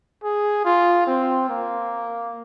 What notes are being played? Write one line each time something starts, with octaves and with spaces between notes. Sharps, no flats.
G#4
F4
C4
A#3